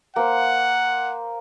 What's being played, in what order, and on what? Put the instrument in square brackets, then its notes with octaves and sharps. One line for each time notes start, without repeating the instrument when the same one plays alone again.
[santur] A#3 C5 [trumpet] F#5